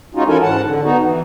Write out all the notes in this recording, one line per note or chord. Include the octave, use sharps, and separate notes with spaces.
G#3 C#4 D#4 F4 F#4
E3 C#4 E4 A4 A#4 G#5
G#2 F#5 A5
D3
B3 D#4 F#4
E3